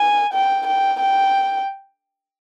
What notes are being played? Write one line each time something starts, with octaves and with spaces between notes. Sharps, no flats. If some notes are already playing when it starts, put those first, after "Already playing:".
Already playing: G#5
G5
G5
G5